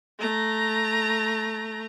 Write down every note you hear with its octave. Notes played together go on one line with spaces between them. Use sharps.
A3 A#5